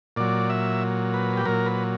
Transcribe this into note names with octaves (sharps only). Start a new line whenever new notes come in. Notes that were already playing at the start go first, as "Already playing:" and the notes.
A#2 F#3 D5
E5
B4
G4
A#2 F#3 A#4
B4